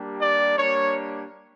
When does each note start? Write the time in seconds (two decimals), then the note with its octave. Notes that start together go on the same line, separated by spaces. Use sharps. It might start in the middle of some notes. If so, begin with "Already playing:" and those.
Already playing: G3 A#3 D4 G4
0.21 D5
0.57 G3 A#3 D4 C#5